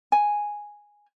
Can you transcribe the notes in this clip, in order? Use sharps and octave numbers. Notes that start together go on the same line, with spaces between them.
G#5